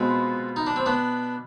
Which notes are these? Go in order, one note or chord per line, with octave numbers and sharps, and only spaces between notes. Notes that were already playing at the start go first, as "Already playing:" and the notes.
Already playing: B2 G#3 B3 C4 F4
D#4
D4
C4
B3 D4